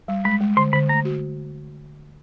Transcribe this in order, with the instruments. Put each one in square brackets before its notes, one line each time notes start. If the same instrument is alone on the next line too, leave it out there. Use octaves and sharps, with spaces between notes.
[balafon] G3
[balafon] G#3 [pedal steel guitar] B5
[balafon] G#3
[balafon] D3 [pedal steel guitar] C6
[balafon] D3 [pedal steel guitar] B5
[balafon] A3 [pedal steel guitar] A#5
[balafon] F#4